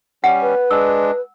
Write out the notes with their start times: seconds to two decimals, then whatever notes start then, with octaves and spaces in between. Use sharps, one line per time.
0.24 G3 C#4 F#5
0.42 B4
0.71 G#3 D4 E6